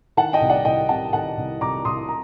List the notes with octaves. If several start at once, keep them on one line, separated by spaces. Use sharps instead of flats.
D#3 F#5 A5
D#5 G5
C2
D5 F#5
C2 D#5 G5
C3 F#5 A5
D#3 F#5 A5
C2
C2 A#5 D6
C2 C6 D#6
A#5